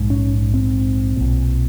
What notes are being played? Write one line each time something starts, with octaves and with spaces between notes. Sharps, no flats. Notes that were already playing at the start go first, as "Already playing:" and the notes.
Already playing: A#1 G#2
C#4
C4
B1 A#2